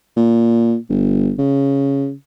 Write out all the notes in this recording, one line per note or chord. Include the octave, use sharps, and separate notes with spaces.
A#2
G1
C#3